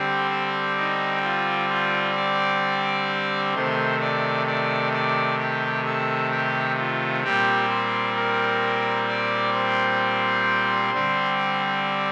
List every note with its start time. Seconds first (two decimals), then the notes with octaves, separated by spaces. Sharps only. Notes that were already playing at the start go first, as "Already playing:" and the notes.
Already playing: D3 G3 C4 C5
0.31 C5
0.77 D#4
1.24 F4
1.69 F4
2.16 D5
3.54 C3 D#3 A3 C5
4.00 D5
4.47 D5
4.93 D5
5.39 G4
5.85 A4
6.31 G4
6.78 F4
7.24 A#2 G3 C4 G4
7.70 C5
8.16 A#4
9.08 D5
9.55 C5
10.93 D3 G3 C4